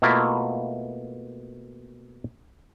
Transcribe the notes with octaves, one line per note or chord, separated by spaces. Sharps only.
B2 A3 A#3 E4 F4